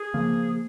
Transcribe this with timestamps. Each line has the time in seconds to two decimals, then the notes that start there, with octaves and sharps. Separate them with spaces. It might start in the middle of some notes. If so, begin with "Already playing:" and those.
Already playing: G#4
0.14 C#3 F3 A#3